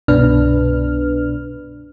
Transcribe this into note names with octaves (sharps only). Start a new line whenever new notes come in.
C2 G2 B2 D4 B4 F6